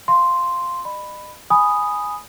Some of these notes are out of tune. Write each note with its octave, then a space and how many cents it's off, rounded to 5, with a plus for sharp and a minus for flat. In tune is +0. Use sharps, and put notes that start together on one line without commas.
F5 +0 C6 +0
D#5 -40 B5 +5
G#5 +0 B5 +0 D#6 +0